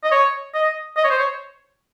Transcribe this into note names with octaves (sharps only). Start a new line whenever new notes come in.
D#5
C#5
D#5
D#5
C#5
C5
C#5